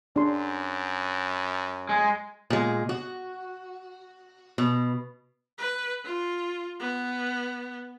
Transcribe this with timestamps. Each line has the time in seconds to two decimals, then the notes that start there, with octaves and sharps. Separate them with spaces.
0.16 F#2 D4 G#4 C6
1.89 G#3
2.50 A#2 G#3
2.89 F#4
4.58 B2
5.58 B4
6.05 F4
6.80 B3